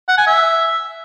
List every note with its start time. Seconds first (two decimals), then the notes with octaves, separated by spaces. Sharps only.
0.08 F#5
0.18 G#5
0.27 E5